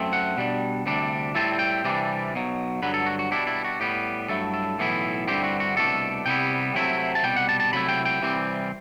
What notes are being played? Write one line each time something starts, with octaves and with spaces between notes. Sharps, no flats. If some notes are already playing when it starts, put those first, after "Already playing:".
Already playing: F#2 A3 C4
F#5
B2 G3 D4
D2 C3 G3 D4
A2 G3 C4 E4 A5
G5
C2 C3 E3 G3 D4
B1 B2 F#3
G2 D3 F#3 B4
A4
F#4
F#4
B2 G3 D4 E4
E4
F#4
A2 G3 B3 G4
G2 F#3 A3 E4 A4
A4
B1 A2 E3 B3 E4
G2 D3 G3 C4 E4 G4
F#4
F#4
C2 B2 A3 D4 A4
C2 C3 G3 B3 E4 G5
C3 F#3 A3 C4 E4
A5
C2 B2 G3 G5
F#5
A5
A5
C3 F#3 A3 E4 B5
G5
G5
C2 C3 E3 G3 C4